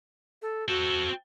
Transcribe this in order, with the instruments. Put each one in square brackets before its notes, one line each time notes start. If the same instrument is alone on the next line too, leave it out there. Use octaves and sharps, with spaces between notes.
[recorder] A4
[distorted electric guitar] C4 A4 [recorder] F#4